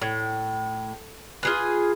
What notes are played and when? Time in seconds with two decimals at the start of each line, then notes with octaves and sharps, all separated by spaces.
0.02 A2
1.43 F4 G#4 B4